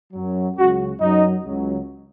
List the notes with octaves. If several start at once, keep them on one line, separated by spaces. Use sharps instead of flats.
F#2 F#3
C#2 C#3 F#3 F#4
F#2 F#3 D#4
C#2 C#3 F#3